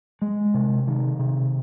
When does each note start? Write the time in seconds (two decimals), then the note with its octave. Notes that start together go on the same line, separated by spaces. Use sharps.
0.22 G#3
0.54 C3
0.87 D#3
1.19 C3